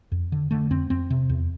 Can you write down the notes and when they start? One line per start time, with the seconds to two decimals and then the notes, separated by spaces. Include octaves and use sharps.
0.12 F2
0.32 D3
0.51 D3 A3
0.70 F2 C4
0.90 F2 C4
1.10 C3
1.30 E2